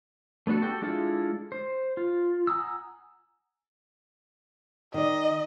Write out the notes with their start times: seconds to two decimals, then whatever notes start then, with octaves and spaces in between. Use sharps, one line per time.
0.47 A3 B3 D4 F#4 A4
0.62 F#4 G4 A4 G5
0.82 G#3 D4 E4 F4 A4
1.52 C5
1.97 F4
2.47 F#5 G#5 A#5 D#6 E6
4.94 D#3 D5 D#5